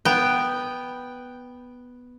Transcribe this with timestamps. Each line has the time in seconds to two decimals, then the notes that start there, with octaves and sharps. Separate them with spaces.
0.05 B3 G5